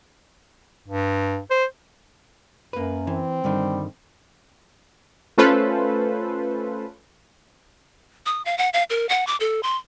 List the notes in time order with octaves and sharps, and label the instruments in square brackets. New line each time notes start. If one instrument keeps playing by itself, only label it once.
[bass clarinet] G2
C5
[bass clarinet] F#2 [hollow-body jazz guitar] A#3 B4
[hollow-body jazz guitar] E3 [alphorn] C4
[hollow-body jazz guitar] G2 D3 D#3 [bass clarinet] G3
[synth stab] A3 C#4 F4 A4 B4 C5
[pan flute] D#6
F5
F#5
F5
A#4
F#5
D6
A4
C6